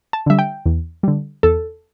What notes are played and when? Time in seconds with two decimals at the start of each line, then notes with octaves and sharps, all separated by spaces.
0.13 A5
0.26 D3 G3 E5
0.39 G5
0.66 E2
1.03 D3 G3
1.43 E2 A4